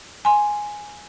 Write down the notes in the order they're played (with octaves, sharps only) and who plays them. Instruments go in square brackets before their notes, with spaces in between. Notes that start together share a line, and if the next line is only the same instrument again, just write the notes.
[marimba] G#5 C6